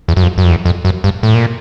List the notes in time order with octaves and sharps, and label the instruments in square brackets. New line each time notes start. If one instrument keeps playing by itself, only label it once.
[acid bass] E2
F#2
F2
F#2
F2
E2
F2
F#2
G2
A2
A#2